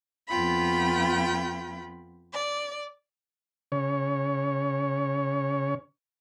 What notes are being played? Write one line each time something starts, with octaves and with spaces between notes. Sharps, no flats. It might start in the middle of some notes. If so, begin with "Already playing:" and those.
F2 B3 F4 G5 B5
D5
C#3 C#5